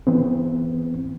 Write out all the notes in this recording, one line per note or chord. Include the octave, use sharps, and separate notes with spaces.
E3 B3 C4